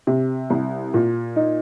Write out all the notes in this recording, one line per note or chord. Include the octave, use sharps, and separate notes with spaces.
C3
C2
A#2
D#4